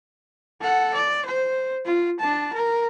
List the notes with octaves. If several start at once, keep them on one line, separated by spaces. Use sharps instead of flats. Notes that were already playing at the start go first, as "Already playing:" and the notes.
A4 F#5
D5
C5
F4
D4 A5
A#4